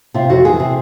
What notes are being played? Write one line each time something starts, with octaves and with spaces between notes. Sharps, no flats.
C3 F4
F2 F#4
E3 G#4
C3